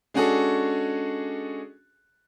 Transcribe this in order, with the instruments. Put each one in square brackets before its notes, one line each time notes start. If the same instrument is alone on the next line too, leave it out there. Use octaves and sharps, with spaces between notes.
[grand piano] G#3 C#4 D4 F#4 G#4 A4